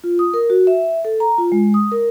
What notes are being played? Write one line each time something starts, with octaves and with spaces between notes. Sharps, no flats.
F4
D#6
A#4
F#4
E5
A4
A#5
F4
G#3
D#6
A#4